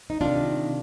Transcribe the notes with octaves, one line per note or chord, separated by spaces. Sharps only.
D#4
C3 D#3 D4 F4